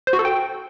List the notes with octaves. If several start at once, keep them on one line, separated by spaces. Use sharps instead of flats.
C5
F#4
A4
G5